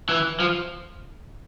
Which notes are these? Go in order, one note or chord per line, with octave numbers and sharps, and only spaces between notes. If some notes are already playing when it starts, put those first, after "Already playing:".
E3
F3